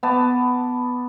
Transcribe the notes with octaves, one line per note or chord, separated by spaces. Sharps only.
B3 A5 D6